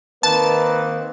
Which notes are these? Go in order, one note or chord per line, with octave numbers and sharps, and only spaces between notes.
D#3 A#3 C4 B4 A5